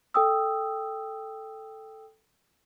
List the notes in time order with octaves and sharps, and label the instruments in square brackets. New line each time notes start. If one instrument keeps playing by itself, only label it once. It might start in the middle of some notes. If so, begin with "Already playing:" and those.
[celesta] A4 G5 D#6 E6